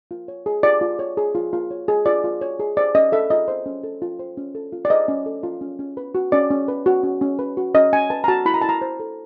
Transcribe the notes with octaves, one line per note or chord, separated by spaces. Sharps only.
F4
C#5
G#4
F4 D5
F4
C#5
G#4
F4
F4
C#5
G#4
F4 D5
F4
C#5
G#4
C5 D5
C#4 D#5
A4 E5
F4 D#5
C5
C#4
A4
F4
C5
C#4
A4
F4
D5
C5 D#5
C#4
A4
F4
C#4
C#4
B4
F#4
C#4 D5
C#4
B4
F#4
C#4
C#4
B4
F#4
C#4 D#5
C#4 G#5
B4 A5
A#5
F#4 A5
E4 B5
A#5
E4 A5
A#5
C5
A4